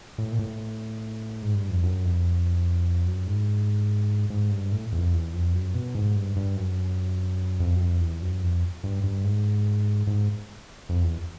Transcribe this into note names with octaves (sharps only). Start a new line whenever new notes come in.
A2
A#2
A2
G#2
G2
F2
F#2
F2
F#2
G#2
G#2
G2
A2
E2
F2
E2
F2
F#2
B2
G#2
G2
G2
F#2
F2
F#2
F2
E2
F#2
F2
G2
G2
G#2
G#2
F2
E2